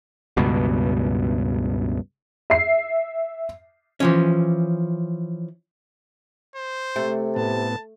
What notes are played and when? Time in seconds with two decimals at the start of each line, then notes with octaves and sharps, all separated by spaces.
0.37 C#2 G2 B2
2.50 E5 C7
4.00 E3 F3 C#4
6.56 C5
6.96 C3 A3
7.36 A2 B3 A5